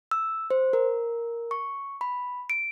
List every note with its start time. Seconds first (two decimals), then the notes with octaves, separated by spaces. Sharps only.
0.11 E6
0.51 C5
0.73 A#4
1.51 C#6
2.01 B5
2.50 D7